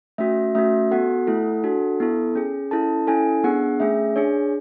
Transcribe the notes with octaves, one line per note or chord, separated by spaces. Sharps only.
A3 C#4 F#4 E5
A3 C#4 F#4 E5
B3 F#4 A4 F#5
A3 E4 A4
D4 F#4 A4
B3 E4 A4
C#4 G#4
C#4 E4 A4 A5
C#4 E4 A4 G#5
B3 D4 G#4 F#5
A3 C#4 G#4 E5
D4 G#4 C#5